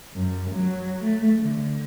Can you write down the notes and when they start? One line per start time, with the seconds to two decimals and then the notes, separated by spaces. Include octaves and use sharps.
0.15 F#2
0.51 F#3
1.04 A3
1.40 D3